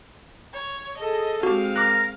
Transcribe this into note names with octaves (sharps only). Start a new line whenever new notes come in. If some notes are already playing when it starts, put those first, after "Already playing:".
C#5
G#4 A4 D#5
G#3 C4 F#4 G4 F5
A#4 D6 F6 F#6